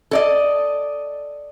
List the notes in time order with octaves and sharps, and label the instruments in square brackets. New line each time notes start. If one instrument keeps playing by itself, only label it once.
[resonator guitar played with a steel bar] A4 D5 D#5